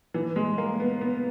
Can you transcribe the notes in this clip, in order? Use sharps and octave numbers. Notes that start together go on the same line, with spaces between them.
E3
G#3
A#3
B3
B3